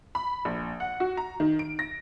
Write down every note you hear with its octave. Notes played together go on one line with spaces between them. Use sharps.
B5
A#1
F#5
F#4
A#5
D#3
D7
A#6